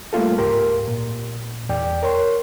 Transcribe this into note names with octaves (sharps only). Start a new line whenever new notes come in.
G3 A3 A#3 F4 A4
C#2 G#2 G4 A#4 C6
A#2
E2 D5 G5
A#4 C#5 C6